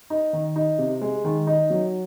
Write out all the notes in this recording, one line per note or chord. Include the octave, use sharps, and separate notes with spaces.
D#4
D#3
D#4
C3
G#3
D#3
D#4
F#3